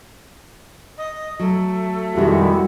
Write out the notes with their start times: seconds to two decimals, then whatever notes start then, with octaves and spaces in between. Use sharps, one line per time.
0.98 D#5
1.39 F#3 A3
2.15 F2 B2 D#3 G3 G#3 E4 F#4 G4